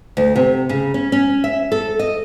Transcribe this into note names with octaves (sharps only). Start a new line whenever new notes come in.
D2
C3
C#3
C#4
C#4
E5
A4
D#5